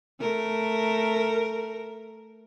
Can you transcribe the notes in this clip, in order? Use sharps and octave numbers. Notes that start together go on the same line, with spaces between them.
A3 A#4